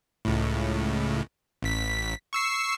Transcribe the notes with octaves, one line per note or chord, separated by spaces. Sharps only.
C#2 A2
A1 B6
C#6 E6 C7